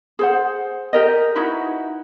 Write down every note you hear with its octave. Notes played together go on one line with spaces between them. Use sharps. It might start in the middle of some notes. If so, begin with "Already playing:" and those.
G#4 C5 F#5
G4 A#4 D#5
D#4 E4 F#4 B4